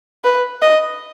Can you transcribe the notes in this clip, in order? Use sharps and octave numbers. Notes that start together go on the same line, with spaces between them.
B4
D#5